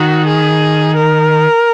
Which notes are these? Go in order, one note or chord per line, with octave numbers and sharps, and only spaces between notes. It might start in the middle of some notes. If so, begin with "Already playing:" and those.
Already playing: D#3 F#4
G#4
A#4